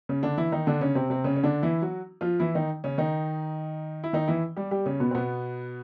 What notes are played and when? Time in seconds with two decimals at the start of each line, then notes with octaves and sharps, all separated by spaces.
0.09 C#3 C#4
0.23 D3 D4
0.38 E3 E4
0.52 D#3 D#4
0.67 D3 D4
0.81 C#3 C#4
0.95 C3 C4
1.10 C3 C4
1.24 C#3 C#4
1.36 C#4
1.43 D3 D4
1.63 E3 E4
1.82 F#3 F#4
2.21 F3 F4
2.40 E3 E4
2.55 D#3 D#4
2.84 C#3 C#4
2.98 D#3 D#4
4.04 E4
4.13 D#3 D#4
4.28 E3 E4
4.56 G3 G4
4.71 G3 G4
4.86 C#3 C#4
5.00 B2 B3
5.11 C4
5.15 B2 B3